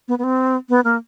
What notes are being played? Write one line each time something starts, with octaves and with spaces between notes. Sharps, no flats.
B3
B3
C4
B3
A#3